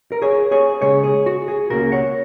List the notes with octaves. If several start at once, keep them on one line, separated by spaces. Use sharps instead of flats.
A#4
G#4 C#5
G#4 C#5
C#3 G#3 C#4 G#4 C#5
G#4
F#4
G#4
C#2 C#3 A#3 F#4 A#4
C#5 F#5